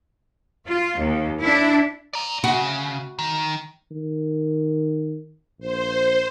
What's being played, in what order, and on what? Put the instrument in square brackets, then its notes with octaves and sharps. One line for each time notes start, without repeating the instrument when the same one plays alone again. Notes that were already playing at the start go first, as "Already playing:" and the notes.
[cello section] F4
D#2
D4 E4
[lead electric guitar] D5 A#5
[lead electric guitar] C#3 [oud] F#4
[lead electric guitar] D#3
[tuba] D#3
[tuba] A#1 [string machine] C5